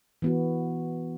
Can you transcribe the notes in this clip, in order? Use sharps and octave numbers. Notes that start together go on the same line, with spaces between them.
E3 B3 F#4